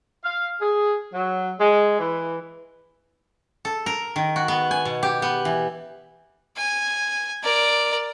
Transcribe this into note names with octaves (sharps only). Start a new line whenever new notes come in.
F5
G#4
F#3
G#3
E3
A4
A#4
D#3
F#4
B3
G#5
B2
G4
B3
E3
G#5
A#4 D5